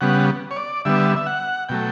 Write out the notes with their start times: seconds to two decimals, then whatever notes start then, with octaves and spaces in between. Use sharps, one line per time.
0.01 C#3 G3 B3 F#5
0.51 C#5
0.56 D5
0.85 D3 G3 B3 E5
1.16 E5
1.26 F#5
1.69 B2 F#3 A3 G5